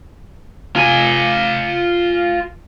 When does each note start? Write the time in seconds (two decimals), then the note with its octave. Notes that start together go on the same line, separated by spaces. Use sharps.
0.76 F4 G#5